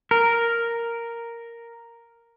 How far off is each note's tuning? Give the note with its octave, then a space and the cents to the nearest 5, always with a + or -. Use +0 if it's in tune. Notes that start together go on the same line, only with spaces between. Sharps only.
A#4 +0